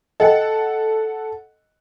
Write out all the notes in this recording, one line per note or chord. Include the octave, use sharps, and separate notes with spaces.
A4 D#5 F#5 G5